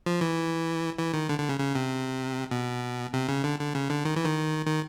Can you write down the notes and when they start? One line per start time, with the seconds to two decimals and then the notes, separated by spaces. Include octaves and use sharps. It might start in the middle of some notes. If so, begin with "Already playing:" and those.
0.06 F3
0.21 E3
0.98 E3
1.14 D#3
1.29 D3
1.39 D3
1.49 C#3
1.60 C#3
1.75 C3
2.51 B2
3.13 C3
3.29 C#3
3.44 D3
3.59 D3
3.75 C#3
3.90 D3
4.05 D#3
4.16 E3
4.25 D#3
4.67 D#3